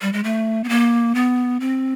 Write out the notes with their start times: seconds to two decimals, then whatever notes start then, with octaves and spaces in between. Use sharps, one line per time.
0.02 G3
0.13 G#3
0.24 A3
0.64 B3
0.69 A#3
1.15 B3
1.60 C4